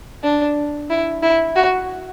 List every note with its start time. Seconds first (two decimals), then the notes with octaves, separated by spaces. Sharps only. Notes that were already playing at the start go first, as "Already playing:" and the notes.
0.23 D4
0.90 E4
1.22 E4
1.55 F#4